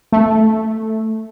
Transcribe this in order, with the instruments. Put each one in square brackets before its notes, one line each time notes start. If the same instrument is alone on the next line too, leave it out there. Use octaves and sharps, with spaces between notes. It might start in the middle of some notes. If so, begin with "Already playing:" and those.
[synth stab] A3